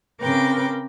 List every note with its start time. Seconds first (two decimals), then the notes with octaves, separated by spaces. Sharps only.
0.21 C#3 C4 A#4 B4 G5 D6